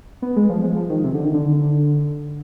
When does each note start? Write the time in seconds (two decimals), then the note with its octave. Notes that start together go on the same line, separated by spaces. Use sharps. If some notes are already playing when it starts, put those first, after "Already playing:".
0.22 B3
0.36 G#3
0.49 F3
0.63 G#3
0.76 F3
0.90 D#3
1.04 C3
1.14 D3
1.24 D#3
1.34 D3